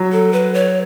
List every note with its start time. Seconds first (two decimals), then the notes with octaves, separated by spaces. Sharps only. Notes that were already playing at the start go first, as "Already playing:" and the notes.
Already playing: F#3
0.12 A4
0.33 B4
0.54 C#5